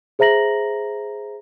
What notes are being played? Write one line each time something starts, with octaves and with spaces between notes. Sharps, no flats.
G#4 C5 E5 A#5 A#6 F#7